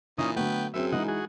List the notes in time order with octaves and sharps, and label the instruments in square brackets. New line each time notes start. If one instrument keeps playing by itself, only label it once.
[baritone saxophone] A#2 [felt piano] E3 [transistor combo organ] C#4 D#4 D#6
[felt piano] D3 F#3 A3 [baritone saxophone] B3 [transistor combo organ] G5
[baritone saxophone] F#2 [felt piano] F#3 C4 G#4 [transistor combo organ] E5
[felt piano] E3 G#3 D#4 [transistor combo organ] D#5 F#5
[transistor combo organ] F#4 G#4